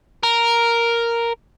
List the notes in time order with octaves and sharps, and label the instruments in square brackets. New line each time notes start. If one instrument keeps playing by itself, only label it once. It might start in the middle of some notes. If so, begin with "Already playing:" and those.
[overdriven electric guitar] A#4